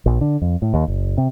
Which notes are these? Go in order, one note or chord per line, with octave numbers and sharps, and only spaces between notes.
A#1
D3
F2
A2
D#2
F#1
C3